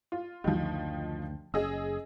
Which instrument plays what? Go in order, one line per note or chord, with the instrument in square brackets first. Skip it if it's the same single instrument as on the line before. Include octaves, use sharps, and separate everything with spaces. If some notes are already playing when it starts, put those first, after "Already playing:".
[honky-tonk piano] F4
[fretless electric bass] F#1 D2 [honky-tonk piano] D#3 F3
[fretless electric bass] F#1 C#4 [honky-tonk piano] G#4 D#5 E6